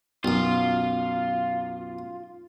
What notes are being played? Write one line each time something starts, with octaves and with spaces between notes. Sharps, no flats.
B1 F#2 F4